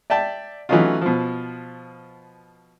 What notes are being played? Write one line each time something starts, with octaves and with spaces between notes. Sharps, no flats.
D5 E5 G5 A5
E3 F#3 A3 C#4 D#4 F4
B2 F3